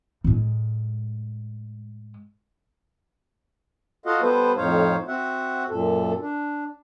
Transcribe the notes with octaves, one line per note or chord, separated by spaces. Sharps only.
A2 G#3
F4 F#4 A4 D#5 F5 F#5
G3 B3 A4 B4 C5
F2 A2 D#4 C5 C#5 F5
C4 F#4 E5 F#5
F#2 A#2 A4
D4